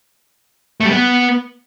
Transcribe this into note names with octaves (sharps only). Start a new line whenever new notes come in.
A3
G3
B3